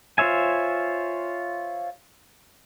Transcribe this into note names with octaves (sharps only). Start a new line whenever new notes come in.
F4 C5 C#5 E5 G#5